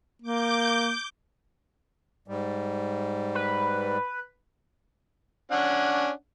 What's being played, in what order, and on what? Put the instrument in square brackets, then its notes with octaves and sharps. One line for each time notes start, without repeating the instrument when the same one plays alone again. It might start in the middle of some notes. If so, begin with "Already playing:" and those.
[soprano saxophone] A#3 [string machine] D6 G6
[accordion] G#2 G3
[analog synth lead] B4
[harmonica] C#4 D4 F#5